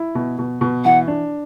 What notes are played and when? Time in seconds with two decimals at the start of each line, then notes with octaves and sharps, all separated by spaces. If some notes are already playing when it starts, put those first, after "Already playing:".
Already playing: E4
0.15 B2
0.39 B2
0.61 B2
0.84 E3 F#5
1.08 D4